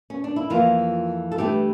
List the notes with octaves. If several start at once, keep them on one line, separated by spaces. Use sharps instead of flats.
C#4
D4
E4
F2 E3 A#3 F4
A4
G2 E3 A3 G4